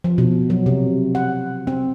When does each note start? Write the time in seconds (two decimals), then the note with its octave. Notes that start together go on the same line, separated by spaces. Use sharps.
0.04 F3
0.18 B2
0.50 F#3
0.66 C3
1.15 F#5
1.67 C4